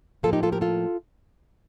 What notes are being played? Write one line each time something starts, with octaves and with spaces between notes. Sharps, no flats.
A2 F3 A#3 F4 A4
D#4 G4
F4 A4
G4 A#4
F4 A4